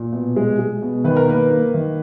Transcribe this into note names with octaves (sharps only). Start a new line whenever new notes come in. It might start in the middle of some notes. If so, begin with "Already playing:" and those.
Already playing: A#2
B2
G#3
G#3
B2
D#3 B4
A#4
A#3 B4
A#3
D#3